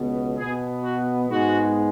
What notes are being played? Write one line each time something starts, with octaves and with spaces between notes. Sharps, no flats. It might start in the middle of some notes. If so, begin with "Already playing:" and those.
Already playing: C#2 B2 B3
B2 B3 G#4
F#4
G#2 G#3 B3 F#4